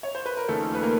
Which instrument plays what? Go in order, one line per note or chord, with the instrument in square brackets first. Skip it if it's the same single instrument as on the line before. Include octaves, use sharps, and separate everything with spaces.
[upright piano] C#5
C5
B4
A#4
[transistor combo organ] D#2 C#3 F3 [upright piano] A3 A4
[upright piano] B4
A#3 A#4